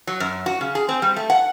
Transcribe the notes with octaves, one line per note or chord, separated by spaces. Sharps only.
F#3
F#2
F#4
C#3
G#4
C4
G3
A3
F#5